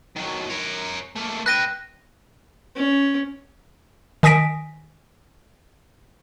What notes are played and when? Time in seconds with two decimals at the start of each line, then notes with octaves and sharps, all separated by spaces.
0.16 D#3 F#3
0.50 A#4 C#5
1.16 A3 A#3
1.46 B4 G5 F#6 A#6 D#7
2.76 C#4
4.23 D#3 G#5 D#6 A#6 B6 D7